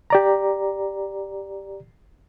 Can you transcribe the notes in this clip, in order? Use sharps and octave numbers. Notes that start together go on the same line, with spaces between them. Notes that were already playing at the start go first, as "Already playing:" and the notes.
G4 D5 A#5